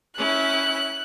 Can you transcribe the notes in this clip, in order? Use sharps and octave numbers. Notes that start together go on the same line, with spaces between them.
C#4 E4 F#6